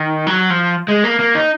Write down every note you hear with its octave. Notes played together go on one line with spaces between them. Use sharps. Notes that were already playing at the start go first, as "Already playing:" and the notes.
Already playing: D#3
F#3
F3
G#3
A#3
A#3
D#4